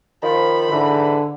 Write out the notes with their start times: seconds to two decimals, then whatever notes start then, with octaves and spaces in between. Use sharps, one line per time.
0.23 D#3 F3 B5
0.71 G#2 D3 E3